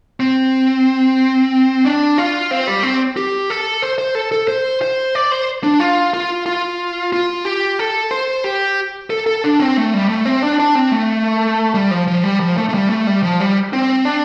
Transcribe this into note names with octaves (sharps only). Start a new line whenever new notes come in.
C4
D4
F4
C4
G3
C4
G4
A4
C5
C5
A4
A4
C5
C5
D5
C5
D4
F4
F4
F4
F4
G4
A4
C5
G4
A4
A4
D4
C4
A3
G3
A3
C4
D4
D4
C4
A3
G3
F3
F3
G3
F3
A3
A3
G3
A3
G3
F3
G3
C4
D4